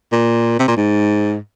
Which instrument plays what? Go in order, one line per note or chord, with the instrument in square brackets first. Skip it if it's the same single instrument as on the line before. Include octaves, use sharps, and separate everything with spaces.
[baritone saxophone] A#2
C3
A#2
G#2